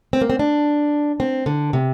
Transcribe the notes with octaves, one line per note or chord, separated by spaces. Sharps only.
C4
A#3
C4
D4
C4
D3
C3